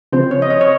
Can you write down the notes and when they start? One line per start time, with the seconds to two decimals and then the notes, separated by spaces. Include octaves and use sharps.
0.13 C#3 F3 C4 C5
0.31 C#5
0.42 D#5
0.50 C#5
0.61 C#5